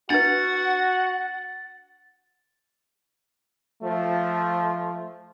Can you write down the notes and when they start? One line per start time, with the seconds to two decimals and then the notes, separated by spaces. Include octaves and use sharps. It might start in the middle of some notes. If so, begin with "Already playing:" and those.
0.10 D4 E4 F#4 B4 F#5 A6
3.82 F3 A3